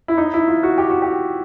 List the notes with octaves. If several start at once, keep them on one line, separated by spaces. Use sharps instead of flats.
E4
D#4
E4
F4
F#4
G4
F#4
G4